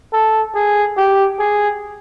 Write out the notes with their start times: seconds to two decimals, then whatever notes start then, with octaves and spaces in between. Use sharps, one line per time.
0.13 A4
0.55 G#4
0.97 G4
1.39 G#4